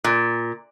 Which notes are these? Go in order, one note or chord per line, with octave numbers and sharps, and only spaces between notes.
A#2